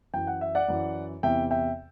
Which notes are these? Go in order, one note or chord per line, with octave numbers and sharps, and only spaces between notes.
F#2 E3 G5
F#5
E5
D5 F#5
F#2 E3
E2 C3 E3 E5 G5
E5 G5